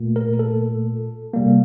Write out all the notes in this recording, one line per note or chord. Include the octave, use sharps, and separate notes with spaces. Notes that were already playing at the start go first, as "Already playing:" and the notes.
Already playing: A#2 A3
A#4
A4
C3 G3 A#3